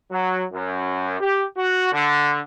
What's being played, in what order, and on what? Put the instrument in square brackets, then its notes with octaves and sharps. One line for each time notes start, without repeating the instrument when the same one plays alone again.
[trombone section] F#3
F#2
G4
F#4
D3